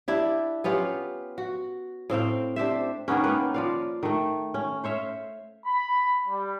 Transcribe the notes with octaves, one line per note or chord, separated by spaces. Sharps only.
D4 E4 G4
B3 C#4 F4 G4
F#4
A2 C4 F5 G5
D4 G4 C5 E5
D#3 A#3 B3 C#4
A#3 D#4 A#4 B4
F3 D5 F5
D#3 A3
C#4
C5 C#5 E5 F5
B5
G3